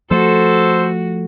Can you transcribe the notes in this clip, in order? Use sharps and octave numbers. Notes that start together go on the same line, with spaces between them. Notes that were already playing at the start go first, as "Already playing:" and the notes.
F3 A3 F#4 A4 C5